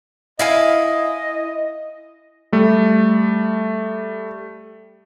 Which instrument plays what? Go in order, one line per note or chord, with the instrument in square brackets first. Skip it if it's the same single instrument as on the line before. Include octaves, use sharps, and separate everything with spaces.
[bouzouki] E4 F5 G#5 [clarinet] D#5
[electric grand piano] G3 A3